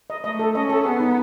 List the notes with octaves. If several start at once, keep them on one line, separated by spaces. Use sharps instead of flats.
D#5
A3 D#5
A4
C#4 D#5
A4
B3 G#4
D#4